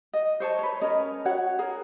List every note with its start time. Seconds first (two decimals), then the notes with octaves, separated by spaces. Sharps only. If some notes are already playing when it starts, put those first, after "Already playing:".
0.13 D#5
0.40 C5 C#5 A5
0.59 B4 C#5
0.81 C#4 A#4 D#5
1.25 F#4 C#5 F#5
1.59 G#4 A#4